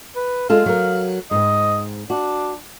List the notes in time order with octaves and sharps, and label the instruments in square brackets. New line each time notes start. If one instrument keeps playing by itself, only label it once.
[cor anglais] B4
[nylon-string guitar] G#3 F4 A4 [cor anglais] F5
[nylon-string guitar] F#3 A#4
[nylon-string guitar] G#2 C4 [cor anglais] D#5
[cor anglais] D4 [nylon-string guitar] F#4